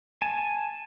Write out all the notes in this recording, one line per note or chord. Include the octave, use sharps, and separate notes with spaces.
G#5 A5